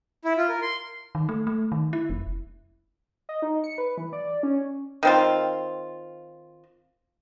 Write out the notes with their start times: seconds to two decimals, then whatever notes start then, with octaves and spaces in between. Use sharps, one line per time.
0.25 E4
0.37 F4
0.49 A#4
0.62 C6
1.15 D#3
1.29 A3
1.47 A3
1.72 D#3
1.93 E4
2.10 F1
3.29 D#5
3.42 D#4
3.64 C#7
3.78 B4
3.97 E3
4.13 D5
4.43 C#4
5.03 D#3 C4 F4